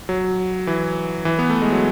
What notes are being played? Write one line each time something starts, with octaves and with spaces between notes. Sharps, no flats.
F#3
E3
E3
B3
A3
G#3
F#3